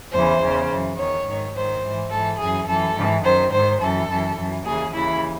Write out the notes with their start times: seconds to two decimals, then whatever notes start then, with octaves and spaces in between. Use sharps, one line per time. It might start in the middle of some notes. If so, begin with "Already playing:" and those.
0.12 E2 C#3 E3 C5
0.40 E2 C#3 E3
0.69 F#2 E3
0.97 E2 D#3 C#5
1.25 G#2 D#3
1.54 G#2 D#3 C5
1.82 G#2 E3
2.10 G#2 E3 A4
2.39 F#2 E3 G#4
2.67 F#2 E3 A4
2.96 G#2 E3
3.23 F#2 D#3 C5
3.52 G#2 D#3 C5
3.80 F#2 E3 A4
4.08 F#2 E3
4.37 F#2 E3
4.65 D#2 C#3 E3 G#4
4.94 D#2 C#3 E3 E4